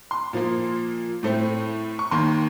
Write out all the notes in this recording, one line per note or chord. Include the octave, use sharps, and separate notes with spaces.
C6
A#2 F3 A#3
A2 A3 C4
C#6
D#2 D#3 A#3 C6